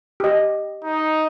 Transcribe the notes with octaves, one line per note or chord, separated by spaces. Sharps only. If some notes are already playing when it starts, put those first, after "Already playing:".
G4 D#5
D#4